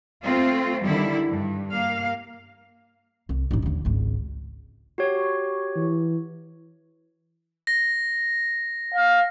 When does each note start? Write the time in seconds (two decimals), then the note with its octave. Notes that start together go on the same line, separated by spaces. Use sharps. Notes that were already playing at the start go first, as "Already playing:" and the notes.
0.23 A3 C4 F4
0.84 D3 D#3 G3 E4
1.30 G2
1.72 A#3 F5
3.29 C2
3.51 A1 D#4
3.63 D#2 D3
3.85 G#1 C#2
4.98 F#4 G4 C#5
5.76 E3
7.67 A#6
8.94 F5